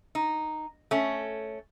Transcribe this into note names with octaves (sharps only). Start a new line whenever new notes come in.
D#4
A3 C#4